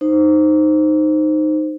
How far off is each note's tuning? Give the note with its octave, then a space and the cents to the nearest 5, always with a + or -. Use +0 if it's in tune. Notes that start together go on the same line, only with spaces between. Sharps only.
D#4 -10 C5 +0